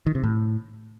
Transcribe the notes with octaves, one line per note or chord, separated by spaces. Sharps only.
D#3
C3
A2